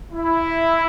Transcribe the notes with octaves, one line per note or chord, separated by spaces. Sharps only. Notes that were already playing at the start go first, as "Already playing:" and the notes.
E4